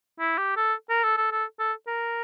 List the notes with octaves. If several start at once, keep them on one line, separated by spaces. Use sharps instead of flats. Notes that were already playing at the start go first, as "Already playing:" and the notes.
E4
G4
A4
A#4
A4
A4
A4
A4
A#4